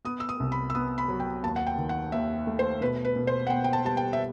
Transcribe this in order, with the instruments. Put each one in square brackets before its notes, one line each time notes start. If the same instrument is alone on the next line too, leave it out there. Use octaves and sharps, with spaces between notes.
[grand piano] B3 [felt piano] D#6
[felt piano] E6
D#6
[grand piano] C2
[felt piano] B5
E6
[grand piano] B3 [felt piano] D#6
[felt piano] B5
[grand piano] F#3
[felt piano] G5
[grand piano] D#2 [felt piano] A5
[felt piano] F#5
G5
[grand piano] D#3
[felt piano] F#5
[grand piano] D#2 [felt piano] E5
[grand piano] A3
[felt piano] C5
[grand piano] B2 [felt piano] B4
[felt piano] B4
[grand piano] B2
[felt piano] C5
F#5
[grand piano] B3 [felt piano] G5
[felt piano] G5
A5
[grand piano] G3 [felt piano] A5
[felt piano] G5
E5